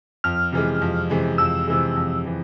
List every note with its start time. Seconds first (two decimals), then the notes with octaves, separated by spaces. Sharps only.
0.24 F2 F6
0.52 C3 E3 G#3
0.81 F2
1.10 C3 E3 G#3
1.38 F2 E6
1.67 C3 E3 G#3
1.96 F2
2.25 C3 E3